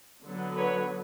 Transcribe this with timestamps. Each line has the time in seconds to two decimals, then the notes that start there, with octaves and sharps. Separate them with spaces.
0.23 D3 F#3 B3
0.56 B4 C#5